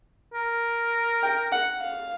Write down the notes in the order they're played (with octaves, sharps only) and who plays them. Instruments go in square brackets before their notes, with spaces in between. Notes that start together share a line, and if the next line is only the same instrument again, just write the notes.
[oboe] A#4
[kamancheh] G5
F#5
F5